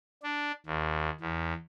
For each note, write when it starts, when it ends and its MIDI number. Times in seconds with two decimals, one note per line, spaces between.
0.23 0.52 62
0.66 1.10 39
1.21 1.53 40